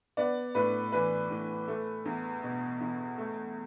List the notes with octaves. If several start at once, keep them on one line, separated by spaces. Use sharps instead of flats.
B3 D5
A2 B4
E3 B4
A2
A3
E2
B2
E2
A3